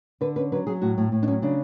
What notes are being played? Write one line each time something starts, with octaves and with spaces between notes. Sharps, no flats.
D3 B4
C#4 B4
F#3 B4
F#3 G#4
A2 F#4
A2
A2
D4
F#3 C#4
C#3 D4